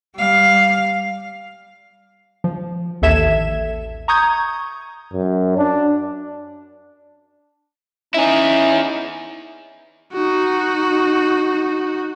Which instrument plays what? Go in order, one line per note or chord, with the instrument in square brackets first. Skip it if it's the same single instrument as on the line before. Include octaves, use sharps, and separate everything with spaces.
[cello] G3 F5
[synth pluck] F3
A1 D#2 A4 E5 G#6 E7
A#5 C#6 D#6 G6 G#6
[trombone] F#2
D4
[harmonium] C#4 D#4 [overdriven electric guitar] E4 G#4
[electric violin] D#4 F#4